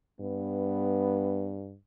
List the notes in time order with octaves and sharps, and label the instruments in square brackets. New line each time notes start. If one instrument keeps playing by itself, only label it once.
[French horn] G2 [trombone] B3